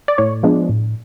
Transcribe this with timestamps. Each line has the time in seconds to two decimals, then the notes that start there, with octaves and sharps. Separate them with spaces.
0.08 D5
0.18 A2 C#5
0.43 F3 G#3 B3 D4
0.69 A2